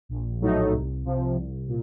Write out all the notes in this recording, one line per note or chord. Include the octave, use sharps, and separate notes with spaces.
A#1
A2 F#3 A3 D#4
C2
C3 F3
C2
A#2